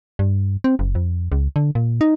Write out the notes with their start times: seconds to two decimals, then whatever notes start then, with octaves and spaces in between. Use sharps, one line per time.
0.19 G2
0.64 C4
0.79 F#1
0.95 F2
1.32 C#2
1.56 D3
1.75 A#2
2.01 D#4